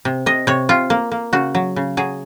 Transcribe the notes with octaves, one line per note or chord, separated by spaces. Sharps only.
C3
C3 D#5
C3 C#5
C3 F4
A#3
A#3
C#3 F#4
F#3
C#3
F#3 G#4